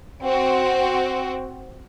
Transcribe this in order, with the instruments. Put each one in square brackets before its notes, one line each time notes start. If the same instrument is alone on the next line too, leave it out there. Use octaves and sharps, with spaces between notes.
[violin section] C4 F#4